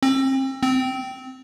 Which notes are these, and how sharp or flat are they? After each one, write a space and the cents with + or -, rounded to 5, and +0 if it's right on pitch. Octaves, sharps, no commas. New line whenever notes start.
C4 +35
C4 -15